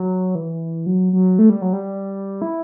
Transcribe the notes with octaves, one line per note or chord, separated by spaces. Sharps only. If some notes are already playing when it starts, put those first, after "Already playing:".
Already playing: F#3
E3
F#3
F#3
A3
G3
F#3
G3
E4